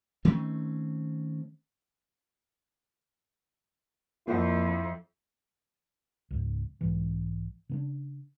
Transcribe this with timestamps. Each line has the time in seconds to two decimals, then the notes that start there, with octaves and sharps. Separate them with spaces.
0.25 D#3 A3 C4 C#4
4.27 F2 A#2 E4
6.31 C#2 G#2
6.81 B1 G#2 E3
7.69 C#3 A#3 D4